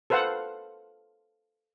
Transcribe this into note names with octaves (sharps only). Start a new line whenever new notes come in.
A4 B4 C5 F5 F#5